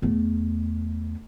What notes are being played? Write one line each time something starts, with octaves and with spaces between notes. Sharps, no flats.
E2 A3